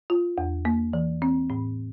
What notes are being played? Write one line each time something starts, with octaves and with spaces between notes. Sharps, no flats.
F4
E2
A#3
E3
C4
A2